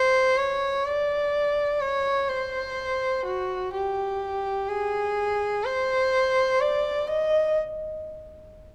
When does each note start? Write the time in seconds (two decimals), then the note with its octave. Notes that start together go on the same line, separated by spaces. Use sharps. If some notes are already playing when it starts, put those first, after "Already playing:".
Already playing: C5
0.37 C#5
0.85 D5
1.81 C#5
2.29 C5
3.25 F#4
3.73 G4
4.69 G#4
5.64 C5
6.61 D5
7.08 D#5